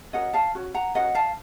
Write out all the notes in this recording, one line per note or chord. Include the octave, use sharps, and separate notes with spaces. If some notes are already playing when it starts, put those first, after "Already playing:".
C#4 F#4 A#4 D#5 F#5
F5 A5
C#4 F#4
F#5 A#5
C#4 F#4 A#4 D#5 F#5
F5 A5